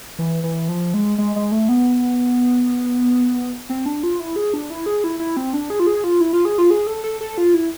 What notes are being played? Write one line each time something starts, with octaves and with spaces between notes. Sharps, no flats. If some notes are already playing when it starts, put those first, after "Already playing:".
E3
E3
F3
G#3
G#3
G#3
A3
B3
C4
D4
F4
E4
G#4
D4
E4
G#4
E4
E4
C4
D4
G#4
F4
G#4
F4
E4
F4
G#4
F4
G#4
A4
A4
A4
F4
E4